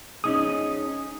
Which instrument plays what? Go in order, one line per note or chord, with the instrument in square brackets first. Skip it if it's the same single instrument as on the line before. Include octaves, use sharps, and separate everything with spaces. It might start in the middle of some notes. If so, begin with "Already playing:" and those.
[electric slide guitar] C#4 D#4 G#4 [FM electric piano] D#6